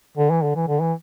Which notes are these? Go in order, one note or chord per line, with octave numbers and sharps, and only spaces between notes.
D3
E3
D3
E3
D3
E3